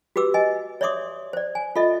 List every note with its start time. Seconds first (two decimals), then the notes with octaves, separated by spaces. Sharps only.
0.16 F#4 G4 B4 D6 E6
0.34 D#5 G#5
0.81 C#5 D5 E5 C6 D6 D#6
1.33 C5 D5
1.55 G#5
1.76 F4 A4 D#5 E5